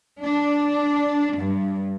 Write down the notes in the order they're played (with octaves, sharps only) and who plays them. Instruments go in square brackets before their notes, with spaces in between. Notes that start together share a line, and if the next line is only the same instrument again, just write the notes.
[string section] D4
G2